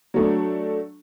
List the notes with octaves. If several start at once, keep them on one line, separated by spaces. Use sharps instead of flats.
F#3 A3 D4